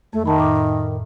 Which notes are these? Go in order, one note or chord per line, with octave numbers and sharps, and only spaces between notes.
F2 A3
D#3 E5 A5 B5
A2 A#4 D6